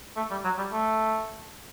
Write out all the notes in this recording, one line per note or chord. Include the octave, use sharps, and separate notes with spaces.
A3
G3
F#3
G3
A3